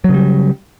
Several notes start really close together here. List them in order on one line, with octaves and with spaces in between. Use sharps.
F#3 C#3 G3